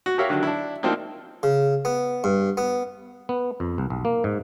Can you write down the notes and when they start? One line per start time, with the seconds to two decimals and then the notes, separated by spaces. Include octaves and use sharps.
0.06 F#4
0.18 F#4 G4 A#4 C#5 E5 F5
0.30 D3 D#3 F#3 D4
0.43 D4 E4
0.83 F3 A#3 C4 D4 D#4
1.43 C#3
1.85 B3
2.24 G2
2.57 B3
3.29 B3
3.60 F2
3.78 C2
3.90 B1
4.05 A#3
4.24 G#2